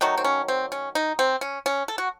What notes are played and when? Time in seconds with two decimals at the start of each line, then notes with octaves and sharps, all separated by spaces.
0.01 D#3 F#3 A3 D#4
0.17 C4
0.24 C#4
0.48 C4
0.72 C#4
0.95 D#4
1.19 C4
1.41 C#4
1.66 C#4
1.88 A4
1.98 F#4